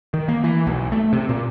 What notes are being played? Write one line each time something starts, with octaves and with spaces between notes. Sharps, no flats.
D#3
A#3
E3
B1
A3
C3
A#2